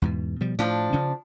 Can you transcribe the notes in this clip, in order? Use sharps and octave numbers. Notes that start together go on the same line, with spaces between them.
E2 G#2 B2
B2 F3 G3
A2 F3 D4
C#3 C#4